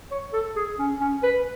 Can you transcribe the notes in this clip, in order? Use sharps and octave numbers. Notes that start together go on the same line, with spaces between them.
C#5
A4
G#4
C#4
C#4
B4